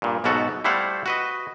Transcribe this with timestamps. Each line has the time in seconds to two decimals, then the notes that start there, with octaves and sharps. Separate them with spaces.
0.02 G2 A#2
0.24 B1 G#2 B2 B3 F#4 A4
0.64 G3 A3 E4 C5 F5 F#5
1.06 F#4 B4 D#5